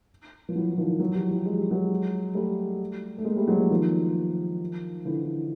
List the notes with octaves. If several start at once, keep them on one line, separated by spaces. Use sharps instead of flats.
F3
E3 F#3
D#3 F3
E3 F#3
F3 G3
F3 G3
G#3
G3
F#3 G#3
G3 A3
A3
G#3 A#3
G3 A3
F#3 G#3
F3 G3
D#3 F3
D3 E3